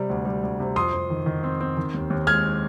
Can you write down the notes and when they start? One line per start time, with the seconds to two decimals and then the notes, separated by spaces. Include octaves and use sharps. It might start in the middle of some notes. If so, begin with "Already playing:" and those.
Already playing: C3 G3
0.10 D2
0.25 G3
0.43 D2
0.60 C3
0.76 F2 C6 D#6
0.93 F2
1.10 D#3
1.26 D#3
1.43 C4
1.61 C4
1.77 D#3
1.94 D#2
2.10 D#2
2.27 G#3 F6 G#6